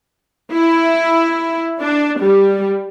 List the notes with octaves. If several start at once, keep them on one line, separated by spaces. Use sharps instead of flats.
E4
D4
G3